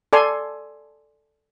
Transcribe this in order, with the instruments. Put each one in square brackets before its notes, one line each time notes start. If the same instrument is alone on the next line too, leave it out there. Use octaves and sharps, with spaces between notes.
[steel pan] A4 D5 G#5 C6